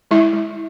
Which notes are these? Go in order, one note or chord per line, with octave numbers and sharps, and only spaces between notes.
G#3 E4 E5
G#3